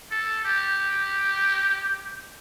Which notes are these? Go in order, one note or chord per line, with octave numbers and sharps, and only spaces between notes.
A4
G4